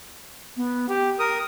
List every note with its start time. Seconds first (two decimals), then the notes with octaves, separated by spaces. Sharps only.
0.57 B3
0.89 G4 G5
1.19 A#4 D#6